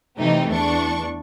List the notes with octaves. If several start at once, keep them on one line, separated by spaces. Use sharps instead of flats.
C3 E3 A3 D#4 G4
E2 D4 C#6